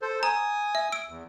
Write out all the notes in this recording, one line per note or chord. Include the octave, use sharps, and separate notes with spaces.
A4 C5
G#5 A#5 D#6
E5
E6 D7
E2